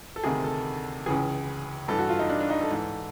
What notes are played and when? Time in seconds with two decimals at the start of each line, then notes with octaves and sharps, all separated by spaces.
0.16 A4
0.24 D2 C3 D#3 G#4
0.44 A4
1.06 C#2 C#3 E3 G#4
1.88 G2 E3 A4
1.99 F#4
2.09 F4
2.19 D#4
2.30 D4
2.40 D4
2.50 D#4
2.61 A4
2.71 G#2 E3